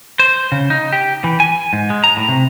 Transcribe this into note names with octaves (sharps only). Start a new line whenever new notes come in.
C5
C#3
D#4
G4
E3
G#5
G#2
G#3
A#5
A2
C3